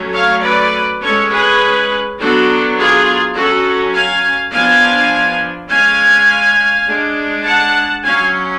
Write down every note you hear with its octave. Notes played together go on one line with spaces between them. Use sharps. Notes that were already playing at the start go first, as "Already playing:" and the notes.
Already playing: F#3 A3 C#4
C#5 F5
B4 D5
G#3 C#4 A4 C#5
G#4 B4
F#3 B3 D4 F#4 A4
F4 G#4
F#3 C#4 F#4 A4
F5 G#5
F3 B3 D4 F5 G#5
G#3 C#4 F5 G#5
G#3 D4
F#5 A5
F#3 C#4 F5 G#5